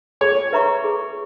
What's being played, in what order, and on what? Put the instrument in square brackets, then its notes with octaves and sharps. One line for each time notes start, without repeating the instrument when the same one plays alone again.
[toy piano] G#4 [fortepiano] C#5
[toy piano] B4 E5 A#5 C#6
G#4